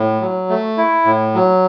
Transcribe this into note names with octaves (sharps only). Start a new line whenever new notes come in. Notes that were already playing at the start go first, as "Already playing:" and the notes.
Already playing: A2
F#3
A3
E4
A2
F#3